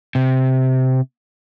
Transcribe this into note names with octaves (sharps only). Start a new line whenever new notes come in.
C3